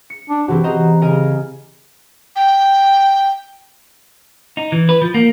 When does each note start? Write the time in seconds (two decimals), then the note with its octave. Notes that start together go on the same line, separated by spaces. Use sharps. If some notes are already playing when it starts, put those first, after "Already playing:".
0.10 C#7
0.30 D4
0.48 C3 E3 C4 F#4
0.64 C5 D#5 A#5
1.02 C#3 A#4 D#5 G#5
2.36 G5
4.57 D#4
4.72 E3
4.89 B4
5.02 F3
5.14 A#3